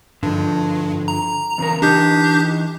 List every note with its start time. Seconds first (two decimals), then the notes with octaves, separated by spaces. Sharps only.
0.23 G2 D3 F3
1.08 A#5
1.58 E2 C#3 A#4
1.82 E3 D4 D#4 G4 G6